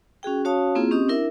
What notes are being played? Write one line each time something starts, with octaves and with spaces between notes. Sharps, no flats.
C#4 F#4 G#4 G5
C#4 F#4 C#5 F5 A5 D#6
A#3 C4 E4 F4 G#4
C4 C#4 G4 D#5 D#6
D4 E4 A#4 E5